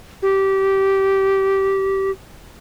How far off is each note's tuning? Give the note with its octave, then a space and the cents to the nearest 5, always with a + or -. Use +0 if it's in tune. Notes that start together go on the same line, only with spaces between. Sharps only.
G4 -20